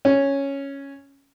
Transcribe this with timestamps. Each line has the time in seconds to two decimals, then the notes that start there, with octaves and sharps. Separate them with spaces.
0.05 C#4